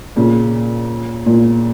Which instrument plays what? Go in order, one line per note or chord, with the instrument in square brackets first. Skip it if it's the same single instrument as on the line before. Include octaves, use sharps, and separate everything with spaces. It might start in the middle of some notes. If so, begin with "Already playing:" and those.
[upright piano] A#2 C#3
A#2